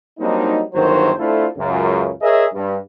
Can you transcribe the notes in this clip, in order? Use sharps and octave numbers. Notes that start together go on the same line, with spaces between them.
F#3 G3 A#3 C4 D4 D#4
G1 D#3 F#3 C5
A3 C4 D4 E4 F4 A4
C#2 F#2 C#3
G#4 A#4 C#5 D#5 E5
G2